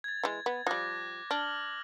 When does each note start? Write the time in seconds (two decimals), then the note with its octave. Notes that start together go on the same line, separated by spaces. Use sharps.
0.04 G#6 A6
0.24 E3 G#3
0.46 B3
0.67 F3 G3 D6 F#6 A#6
1.31 D4 F6 F#7